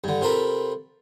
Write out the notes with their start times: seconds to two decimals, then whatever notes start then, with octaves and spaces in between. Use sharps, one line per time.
0.04 G2 D3
0.21 C3 F4 A4 A#4 B5